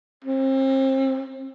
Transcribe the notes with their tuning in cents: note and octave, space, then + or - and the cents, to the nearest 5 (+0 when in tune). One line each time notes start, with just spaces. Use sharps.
C4 +35